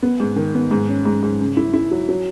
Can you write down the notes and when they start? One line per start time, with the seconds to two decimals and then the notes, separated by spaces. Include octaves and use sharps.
0.02 B3
0.20 G#2
0.36 D#3
0.55 B3
0.71 G#2
0.89 C#4
1.05 G#2
1.23 G#2
1.40 C#3
1.57 E4
1.73 E4
1.91 F#3
2.09 F#3